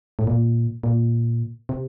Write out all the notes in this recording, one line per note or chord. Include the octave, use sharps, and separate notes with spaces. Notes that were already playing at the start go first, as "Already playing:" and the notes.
A2
A#2
A#2
C3